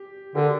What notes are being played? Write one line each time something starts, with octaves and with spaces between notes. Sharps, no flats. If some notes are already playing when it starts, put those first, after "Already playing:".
Already playing: G4
D3 G4 A#4